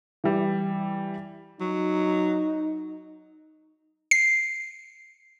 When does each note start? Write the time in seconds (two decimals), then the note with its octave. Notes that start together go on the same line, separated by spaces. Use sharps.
0.24 E3 G3
1.60 F#3 D#4
4.11 C7